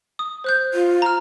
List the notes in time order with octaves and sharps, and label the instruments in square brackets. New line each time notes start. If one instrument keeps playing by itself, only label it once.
[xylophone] D#6
C5 F#6 G6
[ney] F4
[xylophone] A#5 F6